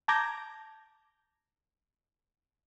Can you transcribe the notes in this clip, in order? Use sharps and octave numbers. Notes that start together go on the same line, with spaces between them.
A5 A#5 D6 G6 G#6 A#6